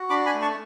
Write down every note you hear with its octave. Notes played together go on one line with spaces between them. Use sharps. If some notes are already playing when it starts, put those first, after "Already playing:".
Already playing: F#4
D4 B5 D6
G#5 B5
A3
A5 C#6